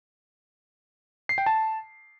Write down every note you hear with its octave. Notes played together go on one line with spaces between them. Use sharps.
C7
G5
A5